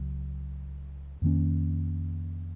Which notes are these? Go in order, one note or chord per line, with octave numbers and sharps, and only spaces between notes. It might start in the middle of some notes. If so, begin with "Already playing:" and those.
Already playing: C#2 F#3
F2 D#3 A#3 C#4